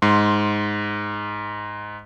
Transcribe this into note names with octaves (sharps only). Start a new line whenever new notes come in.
G#2 C6